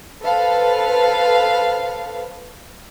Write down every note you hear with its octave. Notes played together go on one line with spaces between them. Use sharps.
A4 B4 C5 F5